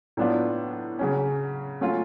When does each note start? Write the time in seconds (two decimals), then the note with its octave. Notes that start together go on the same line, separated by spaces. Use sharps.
0.17 A2 F#3 B3 D4 F4
0.99 C#3 F#3 C#4
1.81 F#3 A3 C#4 F4